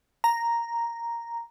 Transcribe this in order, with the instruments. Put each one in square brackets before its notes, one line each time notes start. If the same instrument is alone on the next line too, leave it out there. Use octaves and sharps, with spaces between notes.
[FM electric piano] A#5